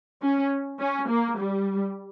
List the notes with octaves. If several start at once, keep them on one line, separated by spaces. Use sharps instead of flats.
C#4
C#4
A#3
G3